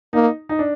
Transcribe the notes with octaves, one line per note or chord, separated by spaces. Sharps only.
A#3 D#4
D#4
D4